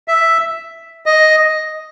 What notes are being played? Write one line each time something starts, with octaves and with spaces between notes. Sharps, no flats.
E5
D#5